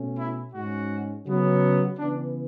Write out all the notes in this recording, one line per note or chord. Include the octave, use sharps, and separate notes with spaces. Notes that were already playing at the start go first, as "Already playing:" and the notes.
Already playing: B2 A3 C#4
E4
G#2 G#3 C#4 F#4
C#3 F#3 B3
C#3 E3 B3 D4